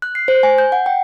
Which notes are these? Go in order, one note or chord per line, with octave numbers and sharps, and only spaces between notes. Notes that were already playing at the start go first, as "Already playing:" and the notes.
F#6
C7
C5
G#5
G6
F#5
G5